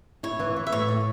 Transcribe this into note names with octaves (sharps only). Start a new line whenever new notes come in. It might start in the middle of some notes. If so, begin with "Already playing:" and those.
E4 C#5
E3
E3
E5
A2 C#5
A2